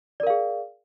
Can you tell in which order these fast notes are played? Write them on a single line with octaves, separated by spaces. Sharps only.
D5 A#4 F5 G#4